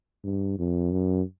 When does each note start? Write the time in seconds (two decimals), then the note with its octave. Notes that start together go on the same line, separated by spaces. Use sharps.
0.24 G2
0.59 F2
0.92 F#2